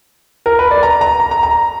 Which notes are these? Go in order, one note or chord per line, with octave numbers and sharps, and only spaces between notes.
A#4
B4
D5
A#5
A#5
A#5
A#5
A#5